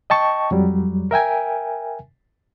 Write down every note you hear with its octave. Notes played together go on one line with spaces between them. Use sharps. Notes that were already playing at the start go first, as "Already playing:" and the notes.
D#5 G5 A5 C#6
F2 F#3 G3
A#4 E5 G5 G#5